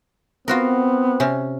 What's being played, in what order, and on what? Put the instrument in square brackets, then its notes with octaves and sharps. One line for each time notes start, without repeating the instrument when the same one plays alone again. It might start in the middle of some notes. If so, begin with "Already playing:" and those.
[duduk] B3 [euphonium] C4 [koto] F4 F#4 A#4
[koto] C3 C#4